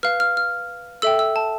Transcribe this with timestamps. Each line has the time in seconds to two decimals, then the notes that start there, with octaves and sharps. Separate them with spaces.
0.03 B4 F5 F6
0.20 F6
0.37 F6
1.02 A4 E5 G5 E6
1.19 E6
1.36 A5